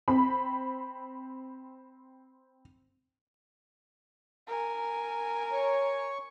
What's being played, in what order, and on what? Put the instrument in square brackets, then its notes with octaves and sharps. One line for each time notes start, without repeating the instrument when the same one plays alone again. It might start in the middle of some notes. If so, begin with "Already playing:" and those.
[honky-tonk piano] C4 B5
[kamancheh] A#4 G#5
[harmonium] C#5